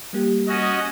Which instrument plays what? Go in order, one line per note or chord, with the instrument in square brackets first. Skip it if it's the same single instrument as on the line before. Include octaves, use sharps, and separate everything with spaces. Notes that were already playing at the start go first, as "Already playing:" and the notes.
[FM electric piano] G3 A#3 G4
[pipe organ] C#4 F#4 [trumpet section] D#5